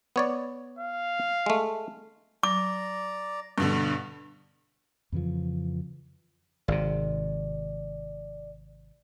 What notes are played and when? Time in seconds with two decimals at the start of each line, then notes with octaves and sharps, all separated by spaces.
0.16 B3 C#5 D5
0.79 F5
1.46 G#3 A3
2.43 D5 A#5 D6
3.58 G2 B2 D3
5.12 F2 C#3 E3 F3
6.68 G#1 C3 D5